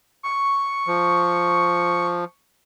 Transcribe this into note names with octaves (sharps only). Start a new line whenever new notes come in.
C#6
F3